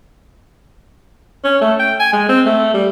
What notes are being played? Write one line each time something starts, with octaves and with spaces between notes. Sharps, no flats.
C#4
A3
G5
G#5
G#3
C4
A3
G3